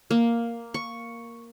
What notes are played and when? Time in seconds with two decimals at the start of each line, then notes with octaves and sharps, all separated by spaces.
0.11 A#3
0.74 C#6